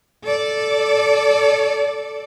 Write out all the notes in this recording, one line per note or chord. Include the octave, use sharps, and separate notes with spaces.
A4 D5